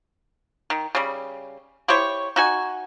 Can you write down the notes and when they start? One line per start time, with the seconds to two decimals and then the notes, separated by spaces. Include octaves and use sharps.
0.70 D#3
0.95 C#3 G3
1.88 E4 G4 C5 C#5
2.36 D#4 F#4 G#5